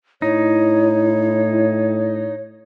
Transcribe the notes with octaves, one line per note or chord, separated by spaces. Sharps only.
A2 D#4 E4 C#5